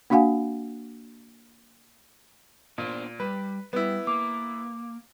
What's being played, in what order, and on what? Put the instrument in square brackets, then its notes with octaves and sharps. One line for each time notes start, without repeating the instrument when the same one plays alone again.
[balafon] A#3 D4 F#4 F5 F#5 G#5
[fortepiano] A#2 [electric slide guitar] B3 D4 C5
[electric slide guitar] G3 [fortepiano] B4
[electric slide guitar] G3 [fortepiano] B3 E4
[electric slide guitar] A#3 [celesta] D6